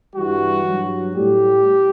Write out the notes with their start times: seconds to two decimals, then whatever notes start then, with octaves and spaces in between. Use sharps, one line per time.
0.16 G2 E3 G3 F#4
0.65 G2 F#3
1.15 A2 G3 G4